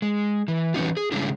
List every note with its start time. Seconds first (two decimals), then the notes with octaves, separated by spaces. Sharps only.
0.02 G#3
0.48 E3
0.74 E3 F#3 G3 C#4 D#4 F4
0.97 G#4
1.12 C#3 G3 G#3 C#4 D4 E4